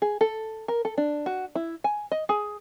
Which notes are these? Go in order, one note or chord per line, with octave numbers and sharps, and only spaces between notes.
G#4
A4
A#4
A4
D4
F#4
E4
G#5
D#5
G#4